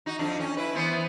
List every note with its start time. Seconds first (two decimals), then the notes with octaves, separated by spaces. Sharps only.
0.06 D#4 F#4
0.19 F2 D4
0.40 C#4
0.57 E4 B4
0.75 E3 B3 C5